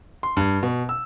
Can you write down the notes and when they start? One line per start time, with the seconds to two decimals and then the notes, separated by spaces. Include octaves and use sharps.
0.23 C6
0.37 G2
0.63 B2
0.89 E6